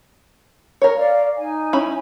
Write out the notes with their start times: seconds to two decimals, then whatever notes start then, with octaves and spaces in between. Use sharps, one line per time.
0.82 A#4 C#5
0.97 D5 F5
1.36 D#4 G#5
1.73 C#4 E4 B5